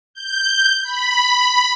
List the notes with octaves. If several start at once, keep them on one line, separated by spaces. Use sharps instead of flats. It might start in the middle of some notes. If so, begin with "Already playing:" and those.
G6
B5